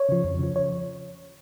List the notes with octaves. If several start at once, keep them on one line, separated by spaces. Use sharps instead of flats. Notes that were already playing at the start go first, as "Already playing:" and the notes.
Already playing: C#5
C#3 F3
F2
C#3 F3
C#5